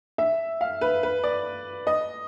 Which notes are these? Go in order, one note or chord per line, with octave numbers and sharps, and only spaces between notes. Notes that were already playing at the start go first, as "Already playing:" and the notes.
E5
F5
B4
B4
D5
D#5